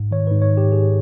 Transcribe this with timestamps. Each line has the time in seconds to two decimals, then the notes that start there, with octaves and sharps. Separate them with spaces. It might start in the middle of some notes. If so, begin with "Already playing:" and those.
Already playing: G#2
0.11 D#3 C#5
0.27 G#2 B4
0.42 C#5
0.51 D#3
0.57 G4
0.72 G#2 G#4